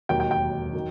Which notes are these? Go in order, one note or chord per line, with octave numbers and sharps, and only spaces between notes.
E1 D#2 D#3 F#3 G5
G5
G5
D#3 F#3